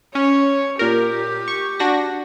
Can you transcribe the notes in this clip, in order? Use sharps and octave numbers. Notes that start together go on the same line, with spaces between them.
C#4 C#5
A#2 G4 A#4
C#6
D4 F#4 A#6